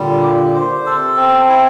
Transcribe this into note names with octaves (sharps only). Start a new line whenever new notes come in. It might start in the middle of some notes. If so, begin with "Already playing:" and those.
Already playing: A#2 D3 G3
G4
C5
D3
C3 A4
C4
E4